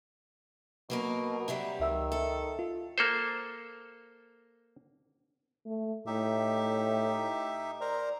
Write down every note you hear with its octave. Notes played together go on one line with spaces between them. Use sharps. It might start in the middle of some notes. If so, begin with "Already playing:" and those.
B2 F#3 A#3 A#4
C3 F#3 G3
C#2 D#3 E5 E6
A4
F4
A#3 A4 C5
A3
A2 D#4 G4 E5
A#4 C5 D5 A#5